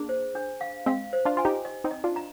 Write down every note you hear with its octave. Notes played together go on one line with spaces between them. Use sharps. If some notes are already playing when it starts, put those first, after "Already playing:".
Already playing: A#3 D4 G#4
C5
D4
F5
G#3 C4 F5
C5
D4 F4
F4 G#5
D#4 G4
D#5
C4 D#4
D#5
D4 F4
A#5